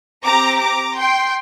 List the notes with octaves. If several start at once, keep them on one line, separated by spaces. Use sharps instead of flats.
C4 G4 A#5 D6
A#5 D6
G5 C6